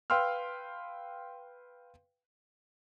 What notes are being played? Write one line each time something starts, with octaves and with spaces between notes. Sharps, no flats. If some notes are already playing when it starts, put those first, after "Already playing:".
B4 F5 G5 C6 E6 F6